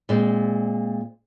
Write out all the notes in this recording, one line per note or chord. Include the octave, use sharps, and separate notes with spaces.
A#2 G#3 C4